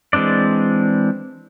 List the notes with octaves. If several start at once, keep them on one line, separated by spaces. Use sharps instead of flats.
E3 G#3 C4 D4 D5